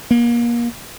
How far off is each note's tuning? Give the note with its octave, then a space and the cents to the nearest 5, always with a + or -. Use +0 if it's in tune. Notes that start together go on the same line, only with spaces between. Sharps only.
A#3 +30